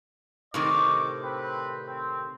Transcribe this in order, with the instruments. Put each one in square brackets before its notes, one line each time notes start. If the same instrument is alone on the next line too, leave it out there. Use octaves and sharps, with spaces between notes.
[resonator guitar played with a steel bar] A2 C3 D#3 [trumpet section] D#5 C#6 D6
[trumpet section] C4 B4
C4